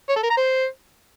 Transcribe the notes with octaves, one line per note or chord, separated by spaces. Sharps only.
C#5
A4
A#4
A#5
C5